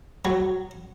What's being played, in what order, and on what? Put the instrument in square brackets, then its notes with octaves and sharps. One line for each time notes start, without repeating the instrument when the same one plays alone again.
[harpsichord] F#3